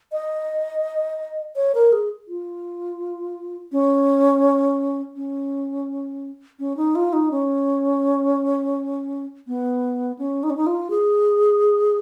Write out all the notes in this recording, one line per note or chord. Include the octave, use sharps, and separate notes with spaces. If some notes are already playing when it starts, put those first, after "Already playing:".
D#5
C#5
A#4
G#4
F4
C#4
C#4
C#4
D#4
F4
D#4
C#4
B3
C#4
D#4
C#4
D#4
F4
G#4